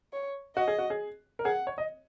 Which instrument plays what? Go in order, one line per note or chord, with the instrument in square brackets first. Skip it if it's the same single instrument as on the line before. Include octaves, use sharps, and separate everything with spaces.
[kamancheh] C#5
[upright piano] F#4 [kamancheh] D#5
[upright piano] G#4
F#4
G#4
A#4
[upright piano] G#4 [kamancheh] F#5
[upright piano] C#5
D#5